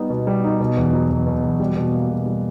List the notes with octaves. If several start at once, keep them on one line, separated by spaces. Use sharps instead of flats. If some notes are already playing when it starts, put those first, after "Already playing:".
Already playing: G3 B3 D#4
B2
G3
D#4
B2
E2
F#3
E2
B2
E2
G3
B2
A#3
B2
G3